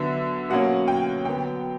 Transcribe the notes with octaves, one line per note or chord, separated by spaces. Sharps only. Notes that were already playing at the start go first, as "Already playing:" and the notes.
Already playing: D3 F#3 B3 E5
B2 F#3 A#3 C#4 F#5
G5
D3 F#3 B3 G5